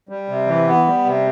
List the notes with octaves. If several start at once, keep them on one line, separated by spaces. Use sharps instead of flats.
G3
C3
E3
B3
G3
C3